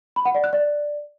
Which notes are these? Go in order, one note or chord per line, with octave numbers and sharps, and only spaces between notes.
B5
F#5
D5
F#6
D5